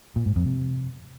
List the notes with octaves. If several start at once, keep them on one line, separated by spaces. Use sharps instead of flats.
A#2
G#2
F2
C3